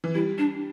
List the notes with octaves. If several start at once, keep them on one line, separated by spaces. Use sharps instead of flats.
E3
G3 E4
D4